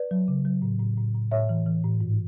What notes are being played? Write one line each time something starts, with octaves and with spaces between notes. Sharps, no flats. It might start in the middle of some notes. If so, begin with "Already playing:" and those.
Already playing: B4 D5
F#3
C#3
F#3
A2
A2
A2
A2
A2 C#5 E5
E3
E3
A2
G#2